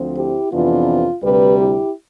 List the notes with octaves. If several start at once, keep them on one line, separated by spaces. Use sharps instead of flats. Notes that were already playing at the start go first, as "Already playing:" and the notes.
Already playing: D2 D3 F3 C4
E4 G4
F2 C3 E3 B3 D4 F4
D2 C3 G3 G4 B4
E4 G4